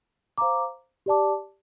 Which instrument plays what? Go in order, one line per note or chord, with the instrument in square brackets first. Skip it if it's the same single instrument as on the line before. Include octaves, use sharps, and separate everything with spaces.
[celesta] C5 F5 A#5 D6
G4 D5 A5 D6